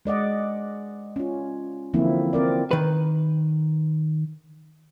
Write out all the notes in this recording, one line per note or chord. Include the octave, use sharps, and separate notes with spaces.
G#3 D5 D#5 F#5
C#4 F4
D3 E3 F3 A#3 C4 E4
C4 A#4 D5
D#3 B4